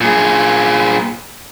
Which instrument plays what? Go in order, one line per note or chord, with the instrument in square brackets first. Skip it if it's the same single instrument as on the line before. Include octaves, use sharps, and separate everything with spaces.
[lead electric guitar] A#2 G#4